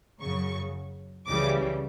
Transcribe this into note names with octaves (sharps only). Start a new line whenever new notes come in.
F#2 C#3 F#3 C#6
C#2 C#3 E3 G3 D6